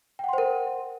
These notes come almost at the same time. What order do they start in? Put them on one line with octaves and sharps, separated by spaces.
G5 F#5 C6 C5 A#4